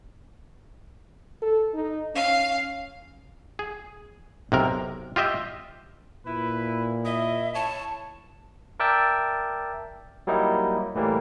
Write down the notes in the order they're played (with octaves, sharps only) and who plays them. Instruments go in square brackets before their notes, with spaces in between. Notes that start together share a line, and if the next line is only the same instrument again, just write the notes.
[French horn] A4
D#4
[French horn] C#4 [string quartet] F5
[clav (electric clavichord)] G#4
B1 C3 A#4
F4 G4 D#5 E5
[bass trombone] A#2 [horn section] E4 B4
[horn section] E4 D#5 [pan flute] E5
[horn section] E4 C#5 [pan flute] A5
[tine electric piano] A#4 D5 E5 G5 A5
F#3 G3 A#3 D#4 E4
A2 E3 G3 A#3